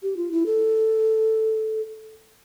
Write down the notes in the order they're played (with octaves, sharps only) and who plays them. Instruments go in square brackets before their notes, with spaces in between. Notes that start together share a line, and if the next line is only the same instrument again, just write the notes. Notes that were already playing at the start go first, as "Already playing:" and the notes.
[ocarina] G4
F4
E4
A4